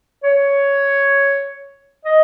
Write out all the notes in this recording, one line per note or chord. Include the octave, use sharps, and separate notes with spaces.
C#5
D#5